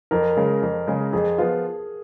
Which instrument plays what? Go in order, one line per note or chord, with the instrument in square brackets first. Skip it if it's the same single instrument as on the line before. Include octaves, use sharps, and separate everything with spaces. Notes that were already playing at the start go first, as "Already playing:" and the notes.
[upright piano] F2 [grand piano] A#4
[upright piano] C#3 G#3
F2
C#3 G#3
[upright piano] F2 [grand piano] G#4
[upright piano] F3 B3 F4